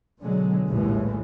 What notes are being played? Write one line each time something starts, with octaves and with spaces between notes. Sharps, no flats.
B2 D3 F#3 G#3
A#1 D#2 A2 E3 G#3